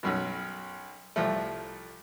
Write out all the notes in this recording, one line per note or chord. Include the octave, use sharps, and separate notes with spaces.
B1 F#2 B2
C2 F3 A3